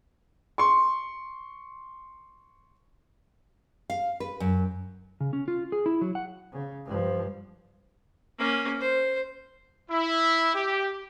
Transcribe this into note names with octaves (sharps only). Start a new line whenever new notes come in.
C6 C#6
F5
B4
F#2
C#3
C#4
F4
G#4
E4
F#3
F#5
C#3
G2 F3
A#3 C#4
C5
E4
G4